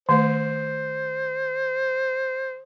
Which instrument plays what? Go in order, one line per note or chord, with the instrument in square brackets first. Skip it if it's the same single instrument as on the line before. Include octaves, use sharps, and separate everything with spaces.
[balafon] D#3 A3 [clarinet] C5